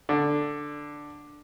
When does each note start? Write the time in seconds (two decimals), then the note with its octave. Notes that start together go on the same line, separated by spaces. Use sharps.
0.09 D3